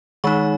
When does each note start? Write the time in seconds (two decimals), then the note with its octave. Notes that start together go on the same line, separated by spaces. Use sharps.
0.24 D#3 G#3 D#4 C#6